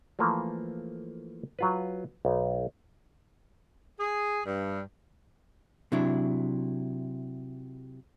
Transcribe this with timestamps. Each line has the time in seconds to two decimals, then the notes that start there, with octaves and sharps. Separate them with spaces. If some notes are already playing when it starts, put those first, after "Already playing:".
0.19 E3 F3 A3 A#3
1.59 F#3 F4 B4
2.25 B1
3.99 G#4
4.46 G2
5.92 C3 F#3 D4 E4